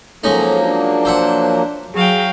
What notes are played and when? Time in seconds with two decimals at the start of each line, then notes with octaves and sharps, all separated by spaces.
0.24 F3 F#3 G#3 A#3 C#4 D#4 A4
0.64 D4
1.05 C5 E5 F#5
1.94 F#3 G#4 F5 G5